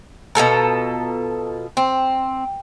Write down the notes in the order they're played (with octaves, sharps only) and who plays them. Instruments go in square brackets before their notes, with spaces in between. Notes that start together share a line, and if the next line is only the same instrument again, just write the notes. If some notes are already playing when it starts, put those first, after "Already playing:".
[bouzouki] B2 F4 A4 A#5
C4